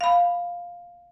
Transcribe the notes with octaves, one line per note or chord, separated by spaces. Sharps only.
F5 B5